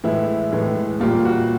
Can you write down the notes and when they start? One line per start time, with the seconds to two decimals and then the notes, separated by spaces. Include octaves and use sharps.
0.04 A2 E3 G#3 E4
0.52 A2 E3 G#3
1.00 A#2 G3 A#3 F4
1.25 F#4